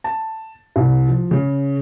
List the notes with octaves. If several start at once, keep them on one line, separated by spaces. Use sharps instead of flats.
A5
C2
F3
C#3